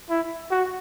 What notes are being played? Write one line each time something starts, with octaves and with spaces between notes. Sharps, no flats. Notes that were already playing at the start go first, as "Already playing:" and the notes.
E4
F#4